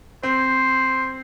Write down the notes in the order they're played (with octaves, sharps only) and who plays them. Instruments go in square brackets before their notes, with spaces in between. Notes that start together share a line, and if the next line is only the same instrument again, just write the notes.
[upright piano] C4 [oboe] C5